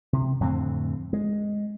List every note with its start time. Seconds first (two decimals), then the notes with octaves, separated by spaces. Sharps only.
0.13 C3
0.40 F2 A2 D3 C4
1.13 G#3